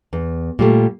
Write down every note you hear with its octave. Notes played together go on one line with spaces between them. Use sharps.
E2
A#2 G3 A3